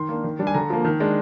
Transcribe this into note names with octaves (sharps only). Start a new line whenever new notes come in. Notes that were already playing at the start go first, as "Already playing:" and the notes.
Already playing: D#3 C6
A#3 D4
D#3
G3 D4
G#5
D3 A#5
F3 A#3
D#3
G#3 D4